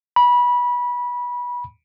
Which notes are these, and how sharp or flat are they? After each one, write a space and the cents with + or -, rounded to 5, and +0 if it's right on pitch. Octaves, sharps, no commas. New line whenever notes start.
B5 -20